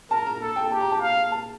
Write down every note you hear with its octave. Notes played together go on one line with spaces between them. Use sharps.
A#4 A5
A#5
A4
G5
G4 A5
A#5
A5
F5
A5